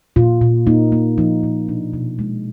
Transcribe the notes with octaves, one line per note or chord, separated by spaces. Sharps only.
A#2 F4
A#2
A#3 D#4
A#3
F3 D#4
A#2
B2 D4
B2
G#3